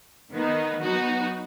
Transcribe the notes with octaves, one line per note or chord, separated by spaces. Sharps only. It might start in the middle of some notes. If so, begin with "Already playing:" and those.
D#3 B3 D#4
F#3 B3 D#4 F#4